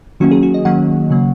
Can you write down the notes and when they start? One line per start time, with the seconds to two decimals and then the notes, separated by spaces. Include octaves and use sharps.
0.20 D#3 F#3 A#3 C#4 F#4
0.31 G#4
0.43 F#4
0.54 D#5
0.65 D#3 F#3 A#3 C#4 F#5
1.10 C#3 F#3 A#3